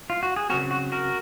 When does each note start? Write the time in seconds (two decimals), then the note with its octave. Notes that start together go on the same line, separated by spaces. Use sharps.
0.10 F4
0.23 F#4
0.36 G#4
0.49 C#3 F#3 C4 F#4 A#4
0.71 F#4
0.92 F#4 A#4